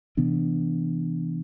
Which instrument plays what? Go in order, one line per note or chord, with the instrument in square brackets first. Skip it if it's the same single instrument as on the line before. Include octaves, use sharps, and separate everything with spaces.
[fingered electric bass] C3 E3 B3 D4